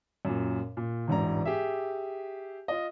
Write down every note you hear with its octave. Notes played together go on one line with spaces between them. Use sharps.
F#2 A#2
A#2
E1 A1 G#2 D4 E4 A#5
G4 G#4 E5
F4 D#5